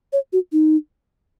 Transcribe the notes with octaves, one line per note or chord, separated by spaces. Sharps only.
C#5
F#4
D#4